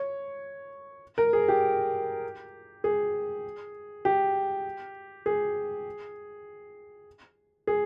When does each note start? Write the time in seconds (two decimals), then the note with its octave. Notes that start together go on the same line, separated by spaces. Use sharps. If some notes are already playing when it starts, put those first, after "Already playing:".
Already playing: C#5
1.18 A#4
1.33 G#4
1.48 G4
2.84 G#4
4.05 G4
5.26 G#4
7.67 G#4